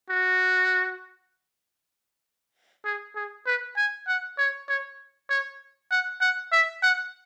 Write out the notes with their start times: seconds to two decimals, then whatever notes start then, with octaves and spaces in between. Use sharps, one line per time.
0.10 F#4
2.85 G#4
3.16 G#4
3.46 B4
3.77 G#5
4.08 F#5
4.38 C#5
4.69 C#5
5.30 C#5
5.91 F#5
6.21 F#5
6.52 E5
6.83 F#5